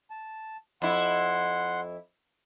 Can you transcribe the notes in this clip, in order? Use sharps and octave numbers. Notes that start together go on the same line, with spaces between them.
A5
F2 E4 F#5 C6